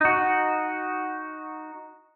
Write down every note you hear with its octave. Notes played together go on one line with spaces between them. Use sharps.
D#4 F#4